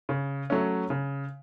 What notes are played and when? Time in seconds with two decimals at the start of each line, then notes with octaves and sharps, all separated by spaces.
0.09 C#3
0.50 F#3 A3 C#4
0.90 C#3